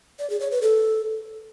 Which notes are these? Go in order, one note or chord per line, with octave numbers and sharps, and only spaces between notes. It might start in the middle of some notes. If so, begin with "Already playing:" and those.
D5
G#4
C#5
B4
A4